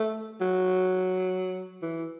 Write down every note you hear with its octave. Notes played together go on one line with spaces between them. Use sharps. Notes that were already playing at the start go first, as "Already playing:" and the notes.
Already playing: A3
F#3
E3